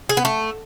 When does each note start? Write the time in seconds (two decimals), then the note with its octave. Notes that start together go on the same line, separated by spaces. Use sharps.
0.09 G#4
0.17 B3
0.25 A3